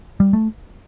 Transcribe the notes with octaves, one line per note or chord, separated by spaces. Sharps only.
G3
A3